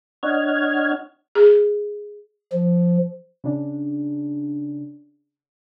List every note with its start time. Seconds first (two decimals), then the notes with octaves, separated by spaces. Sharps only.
0.23 D4 C#5 D#5 F#5 F6 G#6
1.35 G#4
2.53 F3
3.44 C#3 D4